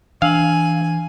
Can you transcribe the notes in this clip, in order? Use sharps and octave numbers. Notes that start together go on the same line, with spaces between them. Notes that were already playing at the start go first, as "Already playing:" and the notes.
E3 D4 F5 G#5 E6 F#7